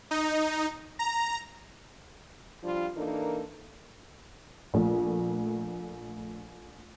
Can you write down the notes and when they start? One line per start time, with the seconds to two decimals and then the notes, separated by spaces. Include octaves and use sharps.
0.11 D#4
0.99 A#5
2.64 F3 G3 D4 F4
2.97 E3 A#3 D4 D#4 A4 A#4
4.74 A#1 A3